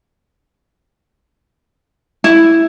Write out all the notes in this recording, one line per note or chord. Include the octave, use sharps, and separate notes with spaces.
E4